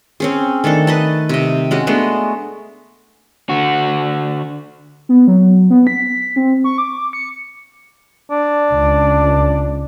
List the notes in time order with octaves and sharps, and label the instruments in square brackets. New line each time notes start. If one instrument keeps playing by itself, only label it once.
[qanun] C4 C#4 G#4
D#3 A3 D4 A4
B4 D#5 A5
C3 D#5
G#3 C#4 F#4
G#3 A3 B3 D4
[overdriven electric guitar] D3 F#4
[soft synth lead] B3
F#3
B3
B6
C4
C#6
D6
C#7
[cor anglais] D4
[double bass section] C#2